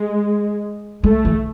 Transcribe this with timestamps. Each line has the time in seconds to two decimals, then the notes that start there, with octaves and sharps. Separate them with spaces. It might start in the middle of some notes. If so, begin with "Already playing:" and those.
Already playing: G#3
1.03 G#3 A3
1.25 E3